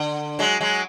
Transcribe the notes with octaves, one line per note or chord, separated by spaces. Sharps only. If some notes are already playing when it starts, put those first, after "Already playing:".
Already playing: D3
F#3 G#3
F#3 G#3